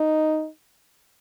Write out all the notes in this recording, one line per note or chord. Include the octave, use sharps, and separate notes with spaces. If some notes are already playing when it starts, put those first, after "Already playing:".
Already playing: D#4